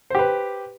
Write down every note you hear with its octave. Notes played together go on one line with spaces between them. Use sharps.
G4 B4 C5